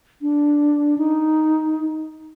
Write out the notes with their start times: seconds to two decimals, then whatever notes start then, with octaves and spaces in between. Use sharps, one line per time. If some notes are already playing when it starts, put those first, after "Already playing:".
0.22 D4
0.98 D#4